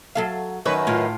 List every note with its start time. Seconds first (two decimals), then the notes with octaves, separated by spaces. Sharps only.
0.15 F#3 A4 F5
0.65 F#2 D#3 B4 C#5
0.87 A2 F4